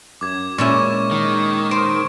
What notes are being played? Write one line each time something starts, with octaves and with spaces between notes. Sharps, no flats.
F#2 D6 G#6
A#2 G#3 C#4 E4 C#6 E7
D#3
C5 D7